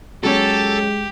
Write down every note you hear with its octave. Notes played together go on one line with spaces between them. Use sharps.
F#3 G#3 C#4 G4 A4 C#5